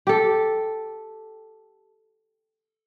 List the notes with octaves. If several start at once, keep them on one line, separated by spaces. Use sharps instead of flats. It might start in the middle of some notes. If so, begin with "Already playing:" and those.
G4 A4